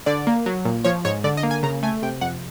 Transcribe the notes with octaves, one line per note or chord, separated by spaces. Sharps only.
D3 D5
A#3
F#3
A#2
F3 C#5
G#2 C#5
D3 D5
D#5
A#3
G#5
C#3 A#5
A3 G#5
C3 G5
F2 F#5